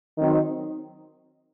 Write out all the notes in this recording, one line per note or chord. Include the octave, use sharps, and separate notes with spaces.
D#3 F#3 C4 D#4